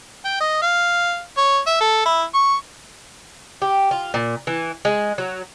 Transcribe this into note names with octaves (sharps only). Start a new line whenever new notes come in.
G5
D#5
F5
C#5
E5
A4
E4
C#6
G4
F4
A#2
E3
G#3
F#3